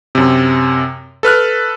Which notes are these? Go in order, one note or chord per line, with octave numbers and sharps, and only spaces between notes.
F#2 C3
A4 B4 F6 F#6